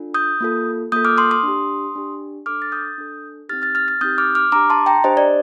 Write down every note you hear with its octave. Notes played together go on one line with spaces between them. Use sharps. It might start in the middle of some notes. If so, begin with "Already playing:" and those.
Already playing: D4 F4 A4
D#6 G6
A#3 F4 A4
A#3 F4 A4 D#6 G6
D6 F6
C6 D#6
C6 D#6
D4 G4
D4 G4
D4 A4 D6 F6
A6
D#6 G6
D4 A4
C4 D#4 G4 F6 A6
F6 A6
F6 A6
F6 A6
C4 D#4 G4 D#6 G6
D6 F6
D6 F6
D4 G4 A#5 D6
A5 C6
G5 A#5
D4 G4 C5 D#5
D5